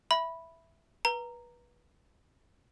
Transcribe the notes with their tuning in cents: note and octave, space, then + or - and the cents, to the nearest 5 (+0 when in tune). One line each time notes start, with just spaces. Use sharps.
E5 +0 B5 +0
B4 -25 A#5 -5